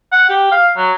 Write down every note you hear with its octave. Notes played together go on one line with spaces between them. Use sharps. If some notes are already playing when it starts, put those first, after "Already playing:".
F#5
G4
F5
F#3